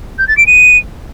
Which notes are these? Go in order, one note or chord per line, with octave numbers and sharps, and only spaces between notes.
G6
A6
D7
D#7